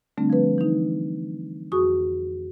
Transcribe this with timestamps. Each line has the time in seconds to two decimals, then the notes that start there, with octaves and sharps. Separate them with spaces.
0.18 D3 G3 A3 C4 D4
0.30 F3 B4
0.58 E3 D#4
1.72 F2 F#4 G#4 C#6 D#6